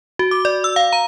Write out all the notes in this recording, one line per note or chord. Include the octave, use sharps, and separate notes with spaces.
F#4
D6
D5
E6
F5
A#5